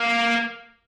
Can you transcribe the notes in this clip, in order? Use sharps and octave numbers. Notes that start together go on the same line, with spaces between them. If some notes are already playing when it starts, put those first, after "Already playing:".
Already playing: A#3